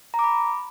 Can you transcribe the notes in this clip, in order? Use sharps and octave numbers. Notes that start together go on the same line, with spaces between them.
A#5
D6
B5